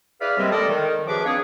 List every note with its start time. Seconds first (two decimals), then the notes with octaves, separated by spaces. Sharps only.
0.20 E4 G#4 B4 D5 F5
0.38 C3 D#3 G3 G#3 A#3 C4
0.51 A4 D5 D#5
0.69 D#3
1.06 F#2 F3 G#4 B4 D6
1.25 A#3 C4 D4 G#4 C#5